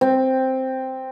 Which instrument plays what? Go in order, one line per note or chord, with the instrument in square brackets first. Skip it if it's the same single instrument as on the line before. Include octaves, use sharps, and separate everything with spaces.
[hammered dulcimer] C4